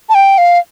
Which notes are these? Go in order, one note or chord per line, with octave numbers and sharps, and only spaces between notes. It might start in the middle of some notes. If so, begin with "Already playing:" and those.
A5
G5
F5